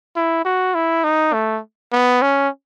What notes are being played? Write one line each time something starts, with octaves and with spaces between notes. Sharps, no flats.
E4
F#4
E4
D#4
A3
B3
C#4